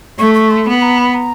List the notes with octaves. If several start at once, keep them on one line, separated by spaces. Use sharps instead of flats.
A3 C#6
C#6
C6
B3 B5
A#5
B5
A#5